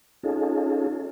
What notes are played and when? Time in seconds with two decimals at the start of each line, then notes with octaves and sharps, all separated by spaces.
0.23 C#4 D#4 F4 G#4 A4